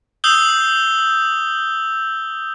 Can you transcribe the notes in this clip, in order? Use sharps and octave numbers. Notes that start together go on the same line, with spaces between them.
D#6 E6 G6 G7